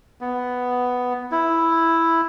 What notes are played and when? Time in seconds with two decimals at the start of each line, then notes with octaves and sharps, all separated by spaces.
0.21 B3
1.31 E4